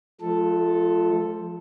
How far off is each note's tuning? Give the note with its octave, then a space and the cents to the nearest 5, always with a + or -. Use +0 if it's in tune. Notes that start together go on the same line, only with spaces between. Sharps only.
F3 -5 G#3 +45 A4 +0